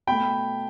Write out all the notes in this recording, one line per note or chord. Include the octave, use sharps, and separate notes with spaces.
B2 A3 G5 B5